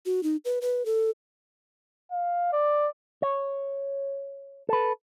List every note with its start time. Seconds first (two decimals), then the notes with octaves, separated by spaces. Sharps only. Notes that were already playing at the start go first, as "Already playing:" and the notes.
0.06 F#4
0.23 D#4
0.45 B4
0.62 B4
0.86 A4
2.12 F5
2.53 D5
3.22 C#5
4.69 A4 B4